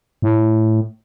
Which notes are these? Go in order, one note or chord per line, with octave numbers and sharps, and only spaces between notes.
A2